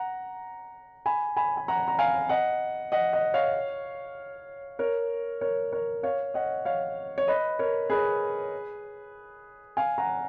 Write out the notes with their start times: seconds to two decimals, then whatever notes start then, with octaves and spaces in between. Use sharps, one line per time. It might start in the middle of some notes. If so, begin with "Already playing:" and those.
Already playing: F#5 A#5
1.06 G#5 B5
1.37 G#5 B5
1.57 G#5
1.68 F#5 A#5
1.88 A#5
1.99 F5 G#5
2.29 D#5 F#5
2.92 D#5 F#5
3.13 D#5 F#5
3.34 C#5 F5
4.79 A#4 C#5
5.41 A#4 C#5
5.72 A#4 C#5
6.03 C#5 F5
6.34 D#5 F#5
6.65 C#5 F5
7.18 C#5
7.28 B4 D#5
7.59 A#4 C#5
7.90 G#4 B4
9.77 F5 G#5
9.98 F#5 A#5